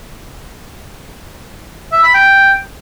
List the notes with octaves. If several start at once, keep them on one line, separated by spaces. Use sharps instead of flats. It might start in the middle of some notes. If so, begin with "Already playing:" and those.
E5
B5
G5